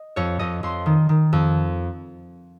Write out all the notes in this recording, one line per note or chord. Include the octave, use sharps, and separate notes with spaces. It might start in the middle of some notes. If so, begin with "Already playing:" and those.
Already playing: D#5
F2 C#5
F2 D#5
F2 C6
D#3
D#3
F2